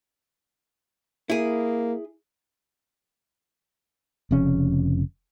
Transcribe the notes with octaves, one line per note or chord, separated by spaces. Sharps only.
A#3 E4 G#4
F1 F2 C#3 C#4